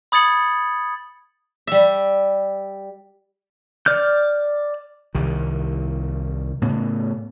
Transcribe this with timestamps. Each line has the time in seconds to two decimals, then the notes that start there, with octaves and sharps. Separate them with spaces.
0.12 B5 D#6 G#6 A6 C#7 F#7
1.67 G3 E5
3.86 D5 F6 G6
5.15 C2 D#3
6.62 A2 C#3 B3